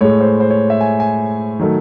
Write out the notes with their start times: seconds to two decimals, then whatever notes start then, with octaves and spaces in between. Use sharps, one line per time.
0.01 A2 G#3 C#5
0.21 C5
0.40 C5
0.50 C#5
0.70 E5
0.81 G#5
1.00 G#5
1.60 D#3 F#3 A3